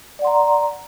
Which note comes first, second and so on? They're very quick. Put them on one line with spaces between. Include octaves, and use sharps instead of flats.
D5 F#5 C6 A#5